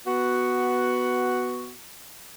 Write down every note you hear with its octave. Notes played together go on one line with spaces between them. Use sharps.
B3 F#4